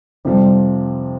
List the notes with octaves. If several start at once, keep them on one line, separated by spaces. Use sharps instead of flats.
F2 C3 F3 G3